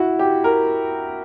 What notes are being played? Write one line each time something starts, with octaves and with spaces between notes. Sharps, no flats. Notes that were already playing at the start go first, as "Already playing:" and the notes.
Already playing: E4 F#4
G4
A#4